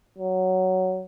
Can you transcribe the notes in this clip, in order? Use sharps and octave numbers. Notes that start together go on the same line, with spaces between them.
F#3